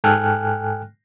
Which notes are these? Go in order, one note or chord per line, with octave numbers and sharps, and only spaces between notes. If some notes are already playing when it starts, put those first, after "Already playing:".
G#2 A4 G5 G#5 F6 F#6